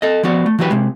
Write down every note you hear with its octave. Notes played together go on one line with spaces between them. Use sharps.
A4 D#5
F3 B3 F#4 D5
A3
E3 F#3 F#4 G4 B4
C3 G#3